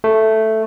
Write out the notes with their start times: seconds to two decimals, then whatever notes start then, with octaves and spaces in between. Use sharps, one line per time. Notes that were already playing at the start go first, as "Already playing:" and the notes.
0.04 A3